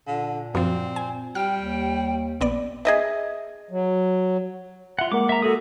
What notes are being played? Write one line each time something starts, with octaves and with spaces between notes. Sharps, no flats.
A#2 D3
F#2 F3 C4
G#5
G3 G5 F6
D#2
A#1 B3 D5
G#4 D#5 E5
F#3
F4 E5 F#5
G#3 A#3 A#4 F#5 D6
E5 A#5
F#4 G#4 A4 D#6